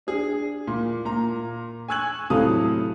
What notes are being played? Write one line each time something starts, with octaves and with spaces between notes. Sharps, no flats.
D4 G#4
A#2
A#2 A#5
G#5 C#6 E6 F#6 G#6 F#7
A2 C3 F#3 A4 F5 D#6